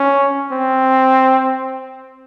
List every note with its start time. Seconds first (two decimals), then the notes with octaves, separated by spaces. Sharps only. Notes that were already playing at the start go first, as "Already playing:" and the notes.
Already playing: C#4
0.52 C4